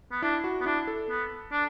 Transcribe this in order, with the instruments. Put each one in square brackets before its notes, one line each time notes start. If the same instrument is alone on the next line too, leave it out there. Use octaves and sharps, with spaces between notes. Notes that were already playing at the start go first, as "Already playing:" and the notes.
[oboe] B3
[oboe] D4 [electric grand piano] E4
[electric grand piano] F#4
[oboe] B3
[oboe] D4 [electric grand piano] E4
[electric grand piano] A4
[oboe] B3
D4